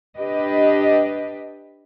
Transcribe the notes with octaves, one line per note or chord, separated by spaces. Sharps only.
D4 G4 B4 D#5